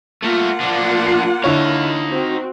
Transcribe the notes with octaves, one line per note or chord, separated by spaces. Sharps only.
A3 A#3 F4 A#4 F#5
F3 D4
C7
D3 D#4 E4 C#5 F5
C4 F#4